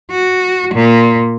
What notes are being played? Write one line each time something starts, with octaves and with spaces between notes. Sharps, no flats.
F#4
A#2